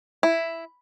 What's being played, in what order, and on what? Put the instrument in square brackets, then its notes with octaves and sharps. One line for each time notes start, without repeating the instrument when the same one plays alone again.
[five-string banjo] E4